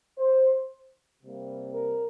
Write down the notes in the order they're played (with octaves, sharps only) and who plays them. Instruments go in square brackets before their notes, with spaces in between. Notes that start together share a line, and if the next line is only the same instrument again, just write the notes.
[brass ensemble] C5
C3 G3 A#3
A#4